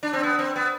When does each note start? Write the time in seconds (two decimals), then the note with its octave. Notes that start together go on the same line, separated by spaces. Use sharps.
0.03 D4
0.13 C4
0.23 B3
0.39 C4
0.56 B3